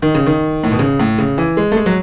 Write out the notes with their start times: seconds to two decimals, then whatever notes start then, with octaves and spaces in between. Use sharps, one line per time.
0.02 D#3
0.15 C#3
0.26 D#3
0.64 A2
0.72 B2
0.79 C#3
0.99 A2
1.18 C#3
1.38 E3
1.57 G#3
1.72 A3
1.76 G#3
1.86 F#3